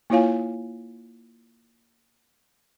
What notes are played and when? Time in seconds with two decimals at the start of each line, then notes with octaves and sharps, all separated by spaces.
0.10 A#3 E4 F4 C#5 F5 G#5